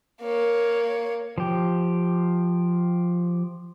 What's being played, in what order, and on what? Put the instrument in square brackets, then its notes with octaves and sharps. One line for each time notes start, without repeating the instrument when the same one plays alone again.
[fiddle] A#3 C#5
[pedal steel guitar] F3 G4